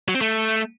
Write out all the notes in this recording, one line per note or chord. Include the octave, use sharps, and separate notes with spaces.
F#3
C4
A3